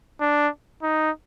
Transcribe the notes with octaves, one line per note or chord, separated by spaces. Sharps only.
D4
D#4